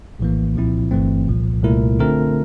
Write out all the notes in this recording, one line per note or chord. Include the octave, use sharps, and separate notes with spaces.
A#1 A2 E3 A#3
C2 A#2 F3 C4 E4
G1 G2 E3 A3 C4
C2 A#2 F3
C2 A#2 A3 E4 A#4
D3 A3 C4 F4 A#4